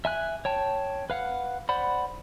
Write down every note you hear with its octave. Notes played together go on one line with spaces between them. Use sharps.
E5 G#5 F#6
C#5 G5 A5
B4 F5 F#5
C5 D5 F#5 B5